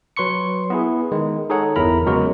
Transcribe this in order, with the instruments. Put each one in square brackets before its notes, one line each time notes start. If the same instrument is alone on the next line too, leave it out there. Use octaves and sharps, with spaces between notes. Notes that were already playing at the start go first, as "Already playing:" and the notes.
[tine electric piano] F#3 B4 C6 C#6 C#7
B3 E4 G#4
D#3 G#3
D#4 G#4 A4 C#5 F#5
G1 E2 E4 A#4 A#5 B5
C#3 F#3 G#3 B3 F#4 A#4